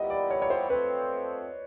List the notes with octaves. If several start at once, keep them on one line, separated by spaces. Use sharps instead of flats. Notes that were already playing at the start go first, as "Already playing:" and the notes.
Already playing: A#2 G3 B3 E4 G4 D#5
D5
C#5
C#5
C5
F3 A3 C4 B4